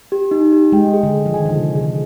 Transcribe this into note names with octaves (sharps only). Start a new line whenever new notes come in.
G4
D#4
G4
G#3 G5
G#4
D3
G5
F3
D#3 G#5
D3
C3 G#4
D3 G#4